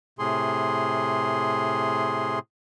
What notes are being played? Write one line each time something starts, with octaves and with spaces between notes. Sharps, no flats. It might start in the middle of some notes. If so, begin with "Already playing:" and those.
A2 C3 G#4 C6